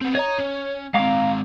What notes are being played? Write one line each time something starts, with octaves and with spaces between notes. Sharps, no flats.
B3 C4
C#5 D#5 A#5
C#4
G#3 C4 F5 A#5 D6